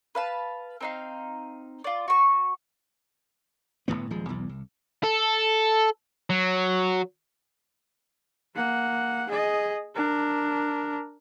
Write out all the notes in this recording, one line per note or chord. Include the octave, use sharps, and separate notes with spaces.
B4 F5 A5
C4 D#4 F5
F4 D5
F#4 C#6
G1 D#2 A2 B3
D#1 F3 G#3
B1 E2
C2
A4
F#3
A#3 F#5
G#4 D#5
D4 A#4